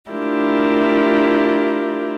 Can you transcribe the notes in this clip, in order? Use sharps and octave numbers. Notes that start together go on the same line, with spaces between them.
A3 D4 E4 F4 G4 A#4